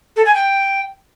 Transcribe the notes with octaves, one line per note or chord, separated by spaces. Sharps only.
A4
G#5
G5